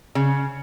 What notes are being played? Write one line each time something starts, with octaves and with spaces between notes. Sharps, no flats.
C#3